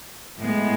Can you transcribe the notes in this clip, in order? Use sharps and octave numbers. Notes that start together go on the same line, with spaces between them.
A2 G#3 B3